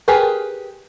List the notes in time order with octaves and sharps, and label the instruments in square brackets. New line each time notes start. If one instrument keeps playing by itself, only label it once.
[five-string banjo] G4 G#4 A#4 B4